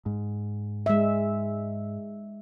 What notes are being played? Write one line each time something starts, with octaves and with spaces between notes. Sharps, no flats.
G#2
G#3 E5